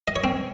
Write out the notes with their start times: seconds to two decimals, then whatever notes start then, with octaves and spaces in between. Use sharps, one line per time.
0.08 D#5
0.16 C#5
0.24 C4